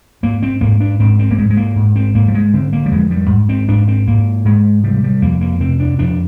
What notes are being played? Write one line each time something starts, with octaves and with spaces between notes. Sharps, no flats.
G#2 A#3
C4
G#2 A#3
D4
G#2 C4
C4
A#3
G#2 G#3
G#3
A#3
G#2
C4
G#2 A#3
G3
G#3
D3 C4
A#3
G3
F2 G#3
G3
G#2
C4
G#2 D4
C4
G#2 A#3
G#2 G#3
C3 G3
G3
F2 A#3
A#3
C3 C4
D4
F2 D4